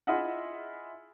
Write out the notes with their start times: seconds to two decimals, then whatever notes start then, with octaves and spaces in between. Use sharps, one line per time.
0.07 E4 F4 G#4 D#5 E5 F#5